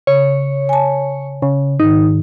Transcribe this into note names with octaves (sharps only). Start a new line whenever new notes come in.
C#3 C#5
G#5 A5
C#3
G#2 D#3 D#4